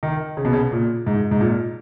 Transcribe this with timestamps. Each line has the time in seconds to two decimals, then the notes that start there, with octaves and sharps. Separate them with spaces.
0.03 D#3
0.37 C#3
0.45 B2
0.53 C#3
0.72 A#2
1.06 G#2
1.31 G#2
1.40 A#2